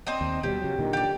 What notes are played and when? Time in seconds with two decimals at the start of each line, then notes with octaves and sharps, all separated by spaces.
0.07 C4 D4 D#5
0.21 D#2
0.43 B2 F3 G3 G4
0.61 C#3 F#3
0.79 A#2 D3 D#3
0.93 G4 D5